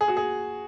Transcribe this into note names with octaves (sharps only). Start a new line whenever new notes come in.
G#4
F#4
G#4